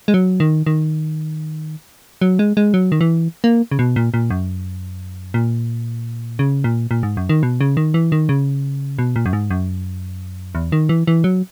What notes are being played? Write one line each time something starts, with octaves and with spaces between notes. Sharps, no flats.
G#3
F#3
D#3
D#3
F#3
G#3
G#3
F#3
D#3
E3
A#3
C#3
B2
A#2
A#2
F#2
A#2
C#3
A#2
A#2
G#2
F#2
D#3
B2
C#3
D#3
E3
D#3
C#3
B2
A#2
F#2
G#2
F#2
E2
D#3
E3
E3
F#3